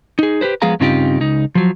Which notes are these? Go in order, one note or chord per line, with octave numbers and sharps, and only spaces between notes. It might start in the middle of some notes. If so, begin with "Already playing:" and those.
D#4 G#4
G4 A4 B4 C5
F3 G#3 B3 G#4 F5 A#5
G2 C#3 C4 D#4 F4 G4
C#2 D#4
F3 F#3